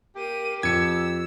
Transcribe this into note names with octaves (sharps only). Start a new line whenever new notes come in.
A#3 G4 D#7
F2 E6 G#6 C#7